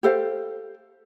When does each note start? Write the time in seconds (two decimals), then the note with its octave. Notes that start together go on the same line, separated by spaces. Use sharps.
0.03 G4 A4 C5 F5